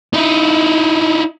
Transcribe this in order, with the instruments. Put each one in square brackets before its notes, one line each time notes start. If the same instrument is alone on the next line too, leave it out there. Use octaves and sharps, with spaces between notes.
[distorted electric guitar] D#4 E4